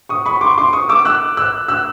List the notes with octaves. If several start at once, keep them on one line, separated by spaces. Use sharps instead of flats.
C#6 D#6
B5 C#6
C6 D6
C6 D6
C#6 D#6
D6 E6
E6 F#6
E6 F#6
E6 F#6